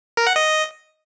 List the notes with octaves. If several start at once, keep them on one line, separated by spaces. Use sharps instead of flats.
A#4
F#5
D#5